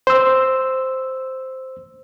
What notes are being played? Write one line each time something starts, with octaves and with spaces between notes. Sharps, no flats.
C5 E6